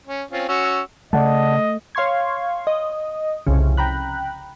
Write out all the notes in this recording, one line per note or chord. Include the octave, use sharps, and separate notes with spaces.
C#4
C4 C#4 F4
C#4 F#4 E6
C#3 A3 D5 D#5 F#5 A5
C#5 F5 C6 C#6 G#6
D#5
C2 F2 C#3
G5 A#5 B5 F#6